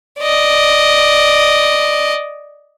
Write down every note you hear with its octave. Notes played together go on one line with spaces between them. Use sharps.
D5 D#5